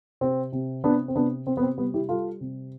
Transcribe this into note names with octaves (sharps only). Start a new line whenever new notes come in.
C3 C4
C3
C3 B3 D4
C4
C3 B3 D4
C3 C4
B3
C4
G3 B3
E4 G4
G3 F4 A4
C3